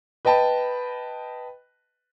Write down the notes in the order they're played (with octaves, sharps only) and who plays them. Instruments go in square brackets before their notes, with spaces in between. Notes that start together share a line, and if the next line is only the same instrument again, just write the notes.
[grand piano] B4 D#5 G5 A5 B5